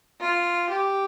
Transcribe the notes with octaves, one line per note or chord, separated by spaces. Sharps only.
F4
G4